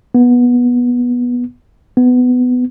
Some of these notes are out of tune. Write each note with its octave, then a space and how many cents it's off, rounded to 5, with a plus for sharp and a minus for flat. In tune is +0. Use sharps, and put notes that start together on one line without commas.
B3 -15
B3 +15